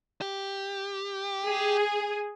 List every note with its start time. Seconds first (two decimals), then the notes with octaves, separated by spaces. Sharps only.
0.21 G4
1.45 G#4